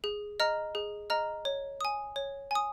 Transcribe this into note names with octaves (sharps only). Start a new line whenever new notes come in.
G#4
D#5 A#5 F6
G#4
D#5 A#5 F6
C#5
G#5 D#6
C#5
G#5 D#6